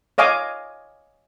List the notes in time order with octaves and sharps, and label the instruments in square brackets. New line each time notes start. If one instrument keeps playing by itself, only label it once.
[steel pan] C#5 D#5 F5 G#5 D6